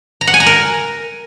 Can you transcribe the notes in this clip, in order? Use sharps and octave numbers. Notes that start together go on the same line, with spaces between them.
A#5
F#5
G#5
A#5
A#4